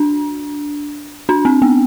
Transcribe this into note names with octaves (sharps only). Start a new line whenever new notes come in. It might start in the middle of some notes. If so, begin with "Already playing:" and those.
Already playing: D4
D4
C4
B3